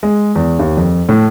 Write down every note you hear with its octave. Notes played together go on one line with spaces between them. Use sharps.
G#3
E2
D#2
F2
A2